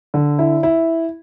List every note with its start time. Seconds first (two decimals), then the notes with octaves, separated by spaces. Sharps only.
0.14 D3
0.39 E4
0.63 E4